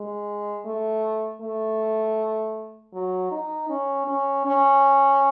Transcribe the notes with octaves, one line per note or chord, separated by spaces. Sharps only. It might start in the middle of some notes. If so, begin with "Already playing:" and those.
Already playing: G#3
A3
A3
F#3
D#4
C#4
C#4
C#4